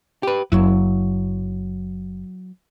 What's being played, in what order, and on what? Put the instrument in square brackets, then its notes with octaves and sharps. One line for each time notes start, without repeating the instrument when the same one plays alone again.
[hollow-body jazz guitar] G4 B4
[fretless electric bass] F#1 F#2 [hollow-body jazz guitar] F#3 E4